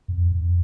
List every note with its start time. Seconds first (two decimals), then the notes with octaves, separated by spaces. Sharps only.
0.08 F2
0.32 F2